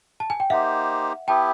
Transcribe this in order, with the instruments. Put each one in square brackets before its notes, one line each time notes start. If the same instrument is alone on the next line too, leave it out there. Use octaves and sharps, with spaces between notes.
[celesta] A5
G#5
G5
[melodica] A#3 D#4 G4 C5 [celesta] E5 F#5
[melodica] B3 E4 G4 [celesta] G5 A5